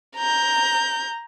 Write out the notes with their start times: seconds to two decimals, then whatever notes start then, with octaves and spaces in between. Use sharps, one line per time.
0.17 A#5 G6